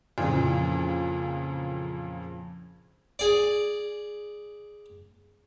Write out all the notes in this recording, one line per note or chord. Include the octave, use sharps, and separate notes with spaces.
F2 A#2 C#3 E3
G#4 D5